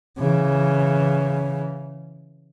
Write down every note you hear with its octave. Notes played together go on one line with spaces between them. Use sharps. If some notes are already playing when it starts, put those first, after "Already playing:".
C#3 E3